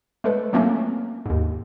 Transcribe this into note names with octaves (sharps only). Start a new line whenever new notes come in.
G#3 A3 A4 B4
F#3 A3 A#3 C4 C#4
D#2 G#2